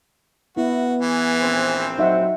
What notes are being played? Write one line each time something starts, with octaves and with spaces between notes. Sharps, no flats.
B3 E4 F#4
E3 G#4
A#1 C4 C5
F#3 D#4 E5 F#5